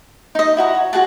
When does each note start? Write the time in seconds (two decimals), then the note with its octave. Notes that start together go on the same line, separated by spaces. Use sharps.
0.35 D#4 D#5
0.57 E4 F#4 A#5
0.75 C#5
0.93 F#4 G#4 F#5 A5